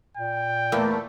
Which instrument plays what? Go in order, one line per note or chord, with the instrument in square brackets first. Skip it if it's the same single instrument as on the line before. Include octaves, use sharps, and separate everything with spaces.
[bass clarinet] A#2 [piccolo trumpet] G5
[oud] E2 A#3 [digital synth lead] A3